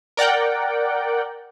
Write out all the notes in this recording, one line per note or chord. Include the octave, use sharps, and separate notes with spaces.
A#4 D5 F#5 G5